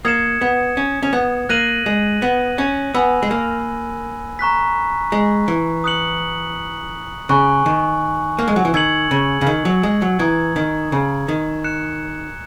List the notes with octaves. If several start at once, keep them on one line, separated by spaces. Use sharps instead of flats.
A#3 D#6 G#6 C#7 E7
B3
C#4
C#4
B3
A#3 F#6 A#6 D#7 F#7
G#3
B3
C#4
B3 G#5 B5 E6
G#3
A#3
A#5 C#6 F#6 B6
G#3
E3
D#6 F#6 C#7 F#7
C#3 G#5 C#6 F#6
D#3
A#3
G#3
F#3
E3
D#3 E6 G#6 C#7 F#7
C#3
C#3
D#3
F#3
G#3
F#3
E3 A#5 D#6 G#6
D#3
C#3
D#3
F#6 C#7 E7